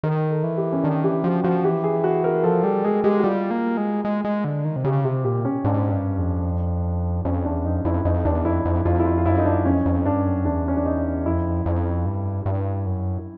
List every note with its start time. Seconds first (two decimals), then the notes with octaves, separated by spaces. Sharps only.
0.03 D#3 A#4
0.31 A4
0.43 E3
0.57 G4
0.73 C#4
0.83 D#3 D4
1.04 E3 G4
1.24 F3 F#4
1.44 F3 F#4
1.64 E3 G4
1.84 G#4
2.04 F#4
2.24 A#4
2.44 F3 A4
2.63 G3 G#4
2.84 G#3 G#4
3.04 G#3 G4
3.19 F#4
3.24 G3 F4
3.51 A#3
3.77 G#3
4.05 G#3
4.25 G#3
4.44 D3
4.65 D#3
4.76 C3
4.84 C#3 G4
5.04 C3 G4
5.24 A#2 G4
5.45 C#4
5.64 G#2 D4
5.92 G2
6.18 F2
7.25 F2 C#4
7.45 E2 D4
7.65 F2 D#4
7.85 F2 E4
8.05 F2 D#4
8.25 E2 D4
8.45 F2 E4
8.65 F2
8.85 F2 F4
9.00 E4
9.05 F4
9.17 F4
9.25 F#2 E4
9.37 D#4
9.45 D4
9.65 F2 C#4
9.86 F2
10.05 G2 D4
10.26 F#2
10.45 E2 D4
10.68 C#4
10.77 D4
10.85 D#4
11.26 F2 E4
11.66 F2
12.06 G2
12.46 G2
12.86 F#2